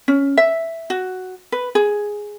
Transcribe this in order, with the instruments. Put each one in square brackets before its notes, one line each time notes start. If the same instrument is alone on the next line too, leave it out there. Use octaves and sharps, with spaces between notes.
[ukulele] C#4
E5
F#4
B4
G#4